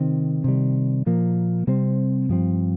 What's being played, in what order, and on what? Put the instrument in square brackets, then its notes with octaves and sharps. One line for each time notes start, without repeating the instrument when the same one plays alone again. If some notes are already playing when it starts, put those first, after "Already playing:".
Already playing: [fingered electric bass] C3 D#3 C4
C3 D#3 G3
A#2 F3 A#3
C3 G3 C4
G2 F3 C4